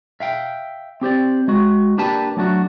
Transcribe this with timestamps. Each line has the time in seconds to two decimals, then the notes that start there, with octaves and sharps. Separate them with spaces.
0.20 E5 F5 G5
1.01 C4 G4 C5 D5
1.48 G#3 F#4
1.98 A#3 D4 G4 B4 A5
2.37 F#3 A3 D4 F#4